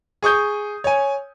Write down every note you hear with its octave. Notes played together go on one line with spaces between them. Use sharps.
G#4 C#6 D#6 G6
C#5 G#5